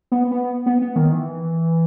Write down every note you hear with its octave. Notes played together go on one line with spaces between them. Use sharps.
B3
B3
B3
B3
D#3
E3